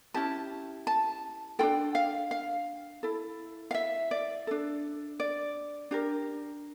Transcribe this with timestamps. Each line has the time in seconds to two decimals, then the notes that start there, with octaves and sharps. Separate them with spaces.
0.14 C#4 E4 G4 A5
0.87 A5
1.59 D4 F4 A4 G5
1.95 F5
2.31 F5
3.03 E4 A4
3.71 F5
3.75 E5
4.11 D5
4.47 D4 A4
5.20 D5
5.91 D4 G4 A#4